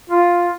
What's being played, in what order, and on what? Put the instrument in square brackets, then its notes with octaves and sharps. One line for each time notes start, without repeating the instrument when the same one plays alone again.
[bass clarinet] F4